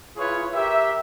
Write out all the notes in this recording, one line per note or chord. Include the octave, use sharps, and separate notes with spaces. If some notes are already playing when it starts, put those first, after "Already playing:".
E4 F4 G#4 B4 C#5
G4 A#4 E5